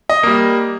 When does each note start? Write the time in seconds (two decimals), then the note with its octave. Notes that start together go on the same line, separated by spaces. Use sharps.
0.09 D#5
0.23 G3 A#3